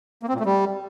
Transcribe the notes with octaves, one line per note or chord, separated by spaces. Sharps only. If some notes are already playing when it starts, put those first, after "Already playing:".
A#3
C4
A#2
A3
G3